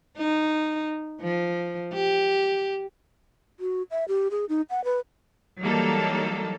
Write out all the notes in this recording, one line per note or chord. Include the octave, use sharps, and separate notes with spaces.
D#4
F3
G4
F#4
E5
G4
G#4
D#4
F#5
B4
E3 F#3 G3 A#3 D#4 A4